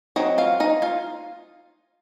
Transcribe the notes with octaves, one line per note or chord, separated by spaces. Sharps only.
F#3 C4 D#4 D#5
F4 F5
D#4 D#5
F4 F5